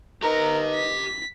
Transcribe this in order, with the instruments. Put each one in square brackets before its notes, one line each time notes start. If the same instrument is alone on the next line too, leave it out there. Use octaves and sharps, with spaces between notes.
[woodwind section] D#4 B4 D#5 [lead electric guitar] G4 A#5 [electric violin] A#4
[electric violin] B6